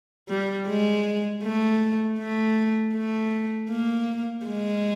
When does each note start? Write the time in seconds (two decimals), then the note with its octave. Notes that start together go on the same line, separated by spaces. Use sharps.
0.29 G3
0.68 G#3
1.43 A3
2.18 A3
2.94 A3
3.70 A#3
4.46 G#3